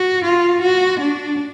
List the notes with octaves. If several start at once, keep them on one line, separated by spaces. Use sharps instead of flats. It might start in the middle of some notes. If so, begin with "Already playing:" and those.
Already playing: F#4
F4
F#4
D4